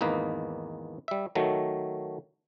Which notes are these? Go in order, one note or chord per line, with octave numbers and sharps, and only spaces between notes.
G#1 E2 A#3 D#4 B4
G3 E5
D#3 F#3 A3